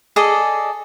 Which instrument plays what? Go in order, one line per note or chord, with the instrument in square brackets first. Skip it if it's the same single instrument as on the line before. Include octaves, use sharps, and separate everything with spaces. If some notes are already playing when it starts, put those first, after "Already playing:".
[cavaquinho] G#4 A4 D5 D#5